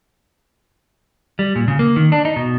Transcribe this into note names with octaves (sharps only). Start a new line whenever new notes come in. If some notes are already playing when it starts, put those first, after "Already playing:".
G3
A#2
C#3
A#3
D#3
D4
D#4
B2